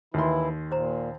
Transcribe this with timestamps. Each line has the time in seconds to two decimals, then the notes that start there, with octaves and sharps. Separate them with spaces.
0.14 D#2 E3 E4 C6
0.71 A#2 G4 C5 A#5